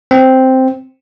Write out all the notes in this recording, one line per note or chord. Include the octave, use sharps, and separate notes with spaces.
C4